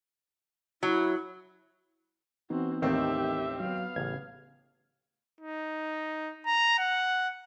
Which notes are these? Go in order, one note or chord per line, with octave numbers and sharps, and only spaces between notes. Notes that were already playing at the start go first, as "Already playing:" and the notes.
F#3 E4
E3 B3 C4 D#4 F#4
A1 D#2 D#3 A3 C4 G4 E5
F#3 B3 F5
A1 C#3 G#6
D#4
A#5
F#5